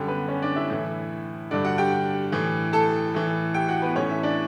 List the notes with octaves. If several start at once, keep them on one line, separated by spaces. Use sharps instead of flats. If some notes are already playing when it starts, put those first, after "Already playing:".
Already playing: F#2 D3 G3 G4
B3 B4
C#4 C#5
D4 D5
E4 E5
A2 E3
G2 D3 D4 D5
F#4 F#5
G4 G5
A2 E3
A4 A5
A2 E3
G4 G5
F#4 F#5
B3 B4
A2 E3 C#4 C#5
E4 E5
D4 D5